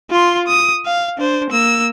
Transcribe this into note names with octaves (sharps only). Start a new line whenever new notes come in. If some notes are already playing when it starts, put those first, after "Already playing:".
F4 C6
D#6
F5
D4 C5
A#3 E6